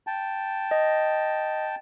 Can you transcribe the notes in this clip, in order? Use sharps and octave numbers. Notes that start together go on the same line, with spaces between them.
G5 A5
D#5